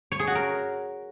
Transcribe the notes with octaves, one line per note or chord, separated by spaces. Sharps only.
C#5
G#4
F#4
A#4